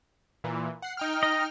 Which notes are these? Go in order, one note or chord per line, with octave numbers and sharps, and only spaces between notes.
A#2 E3
F#5 C7
D#4 G5 F6
D#5